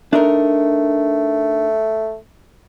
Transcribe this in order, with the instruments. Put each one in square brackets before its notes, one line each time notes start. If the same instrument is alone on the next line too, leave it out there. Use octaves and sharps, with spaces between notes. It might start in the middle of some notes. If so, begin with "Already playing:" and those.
[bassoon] A3 [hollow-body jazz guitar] D4 D#4 A#4